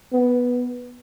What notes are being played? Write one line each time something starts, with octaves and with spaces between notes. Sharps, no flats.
B3